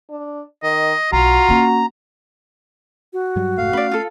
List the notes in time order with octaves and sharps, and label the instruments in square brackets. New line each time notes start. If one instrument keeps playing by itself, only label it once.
[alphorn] D4
[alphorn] D#3 [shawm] D#5
[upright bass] B1 [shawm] F4 [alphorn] F#4 [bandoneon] A#5
[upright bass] A#3 C#4
[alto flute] F#4
[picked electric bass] G2 F#3 G3
[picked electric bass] F1 G#2 A3 [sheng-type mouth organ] F5
[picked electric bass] A3 C#4 [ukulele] B4 D5
[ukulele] F4 A4